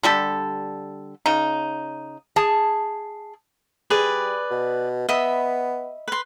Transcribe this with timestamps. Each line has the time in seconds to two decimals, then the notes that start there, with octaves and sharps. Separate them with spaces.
0.03 D3 G3 G4 A4
1.26 C#3 D#4
2.36 G#4 A5
3.90 G3 G#4 B4 D5
4.51 B2
5.09 B3 D#5 E5 B5
6.08 B4 C6